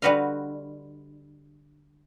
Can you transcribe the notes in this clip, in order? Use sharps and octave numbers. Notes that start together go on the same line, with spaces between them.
D3 G3 F#4 B4 D#5 F5